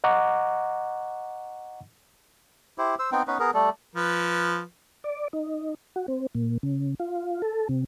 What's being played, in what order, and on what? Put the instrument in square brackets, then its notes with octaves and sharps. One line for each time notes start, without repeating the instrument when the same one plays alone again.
[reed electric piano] D#5 F#5 A#5 C#6 D6
[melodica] E4 G4 C5
C5 E6
B3 C4 D#4 G5
B3 C#4 D#4 B4
B3 G#4 A#4
G3 A3 A4
[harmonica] F3 B4
[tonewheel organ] D5
D#4
F#4
C4
A#2
C#3
F4
A4
C3